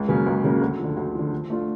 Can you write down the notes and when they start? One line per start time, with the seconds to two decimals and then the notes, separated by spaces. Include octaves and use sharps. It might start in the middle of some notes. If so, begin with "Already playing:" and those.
Already playing: C#2
0.08 C#3 F#3 A#3 C#4
0.26 C#2
0.44 C#3 F#3 A#3 C#4
0.61 D2
0.79 D3 F3
0.97 D2
1.15 D3 F3
1.32 F3
1.50 A3 D4 F4